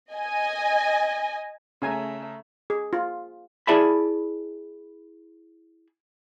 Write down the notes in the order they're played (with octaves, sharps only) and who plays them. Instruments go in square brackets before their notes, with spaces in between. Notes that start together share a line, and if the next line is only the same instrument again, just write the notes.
[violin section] D#5 G#5
[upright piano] C#3 A#5 [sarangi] A3 [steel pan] C#4 G#5
[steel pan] G#4
F4
[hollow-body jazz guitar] E4 G#4 D5 E5 A5 B5